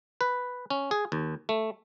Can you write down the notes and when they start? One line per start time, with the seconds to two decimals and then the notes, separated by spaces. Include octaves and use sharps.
0.21 B4
0.70 C#4
0.91 G#4
1.12 D#2
1.49 A3